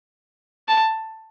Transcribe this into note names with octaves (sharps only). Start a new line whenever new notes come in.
A5